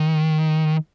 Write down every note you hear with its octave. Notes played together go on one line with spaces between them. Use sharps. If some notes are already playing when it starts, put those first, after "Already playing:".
Already playing: D#3